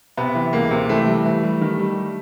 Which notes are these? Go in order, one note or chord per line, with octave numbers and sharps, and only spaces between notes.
C3 B3
E3
C#2 A#3
C3
E3 A3
G3
E3
G3
D#3
G3